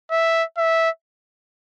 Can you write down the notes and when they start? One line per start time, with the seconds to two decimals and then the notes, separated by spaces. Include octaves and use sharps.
0.11 E5
0.57 E5